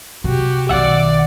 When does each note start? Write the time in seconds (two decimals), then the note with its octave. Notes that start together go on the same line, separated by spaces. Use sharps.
0.24 C3 F#4 G4
0.69 B1 D#3 D5 E5 F#5